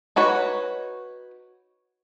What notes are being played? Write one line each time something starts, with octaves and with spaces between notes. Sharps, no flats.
D#4 F#4 B4 C#5